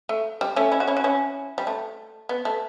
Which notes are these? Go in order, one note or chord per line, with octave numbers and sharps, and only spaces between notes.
A3
G3
A3 C#4
C#4 E4
F#4
C#4 E4
F#4
C#4 E4
G3
A3
B3
A3